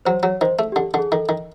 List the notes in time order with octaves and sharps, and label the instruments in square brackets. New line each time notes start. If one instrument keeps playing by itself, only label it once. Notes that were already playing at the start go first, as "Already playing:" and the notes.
[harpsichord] F#3 [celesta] C5
[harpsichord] F#3 [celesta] C#5
[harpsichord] D#3 [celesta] C5
[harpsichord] A3
[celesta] G4
[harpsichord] D3
[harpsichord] D3 [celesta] G#4
[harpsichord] D#3 [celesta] A4
[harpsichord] D#3